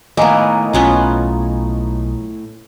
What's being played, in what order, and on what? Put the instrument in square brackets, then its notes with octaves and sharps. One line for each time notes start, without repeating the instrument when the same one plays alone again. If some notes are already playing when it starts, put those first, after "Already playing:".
[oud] A2 [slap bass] D#3 [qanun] A#3 B3 [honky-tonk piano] D#5 G#5 A#5
[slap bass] B1 [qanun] B3 C#4 F4